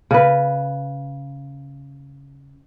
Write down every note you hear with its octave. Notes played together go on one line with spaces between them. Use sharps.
C#3 B4